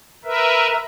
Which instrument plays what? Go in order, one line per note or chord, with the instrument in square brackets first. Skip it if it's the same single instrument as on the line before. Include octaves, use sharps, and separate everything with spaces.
[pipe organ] A#4 B4 E5